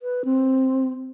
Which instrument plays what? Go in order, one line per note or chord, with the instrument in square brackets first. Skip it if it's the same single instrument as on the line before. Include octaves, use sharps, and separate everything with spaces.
[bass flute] B4
C4